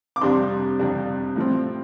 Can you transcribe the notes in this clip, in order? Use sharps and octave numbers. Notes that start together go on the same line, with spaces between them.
D6
F2 C3 G3 D4 C6
F2 C3 G3 D4
A2 F3 C4